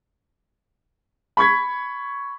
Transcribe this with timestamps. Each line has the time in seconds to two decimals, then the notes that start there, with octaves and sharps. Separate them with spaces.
1.37 B5 C#6 G#6 B6